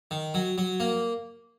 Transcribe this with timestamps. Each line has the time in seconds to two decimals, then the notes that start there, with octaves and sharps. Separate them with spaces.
0.11 D#3
0.34 F#3
0.58 F#3
0.80 A#3